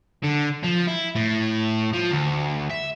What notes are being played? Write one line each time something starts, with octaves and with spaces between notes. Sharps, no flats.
D3
F3
E4
A2
F3
D2
E5